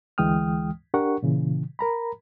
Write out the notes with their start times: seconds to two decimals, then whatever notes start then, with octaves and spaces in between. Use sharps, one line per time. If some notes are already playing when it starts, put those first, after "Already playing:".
0.18 D2 E3 G#3 G5 D#6 F6
0.94 D4 G4 A#4 F#5 C#6
1.23 A#2 C#3 E3
1.79 A#4 A#5 B5